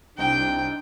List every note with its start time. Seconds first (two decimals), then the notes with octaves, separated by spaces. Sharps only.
0.18 C2 C4 D4 D#4 G5